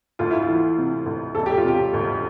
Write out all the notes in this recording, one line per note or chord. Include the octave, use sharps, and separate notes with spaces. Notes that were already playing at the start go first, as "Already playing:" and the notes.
D2 F4
E4
F4
E3
C3
D2
E1 A4
G4
F4
C3 G4
D2